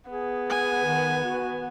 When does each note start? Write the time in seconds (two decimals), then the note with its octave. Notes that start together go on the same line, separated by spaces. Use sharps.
0.10 B3 G#4
0.50 G#5
0.85 D#3
1.24 F#4